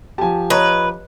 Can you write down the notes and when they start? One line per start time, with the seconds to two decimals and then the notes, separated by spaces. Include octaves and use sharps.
0.18 F3 G4 G#5 A5
0.50 B4 C#5 D#5 A#5